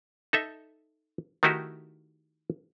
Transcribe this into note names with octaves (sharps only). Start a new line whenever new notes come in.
D#4 A4 E5
D#3 A3 D#4 E4 F#4 G4